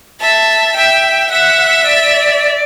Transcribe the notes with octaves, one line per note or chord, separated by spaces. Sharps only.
E5 A5
E5 G5
E5 F#5
D5